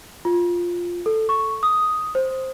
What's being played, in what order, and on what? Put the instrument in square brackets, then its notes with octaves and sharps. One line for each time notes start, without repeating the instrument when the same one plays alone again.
[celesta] F4
A4
C#6
D#6
C5